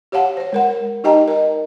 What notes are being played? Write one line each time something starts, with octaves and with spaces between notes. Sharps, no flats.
G4 C#5 F5 F#5 A5
C5 C#5
G#3 A#4 F#5
D#4 G4 D#5 G5 A5 A#5
A#4 D#5